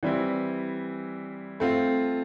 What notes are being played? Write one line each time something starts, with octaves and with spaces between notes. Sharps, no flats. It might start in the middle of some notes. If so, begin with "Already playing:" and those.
E3 G3 C4 E4
A3 C4 F4